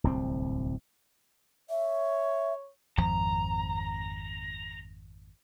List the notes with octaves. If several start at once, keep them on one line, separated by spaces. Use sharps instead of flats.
D1 C2 C4
C#5 E5
G#1 F2 F3 A#5